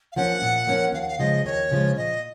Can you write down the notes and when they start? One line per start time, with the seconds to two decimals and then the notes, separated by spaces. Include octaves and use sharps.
0.12 F5
0.16 F3 A#3 C#4 F#5
0.42 A#2
0.67 F3 A#3 C#4
0.93 D#2 F5
1.01 F#5
1.08 F5
1.19 C#3 F3 G#3 D#5
1.45 D#2 C#5
1.71 C#3 F3 G#3
1.96 A#2 D#5